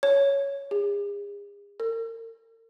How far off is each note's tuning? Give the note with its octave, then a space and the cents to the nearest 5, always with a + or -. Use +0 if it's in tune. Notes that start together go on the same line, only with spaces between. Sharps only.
C#5 +5
G#4 -40
A#4 -40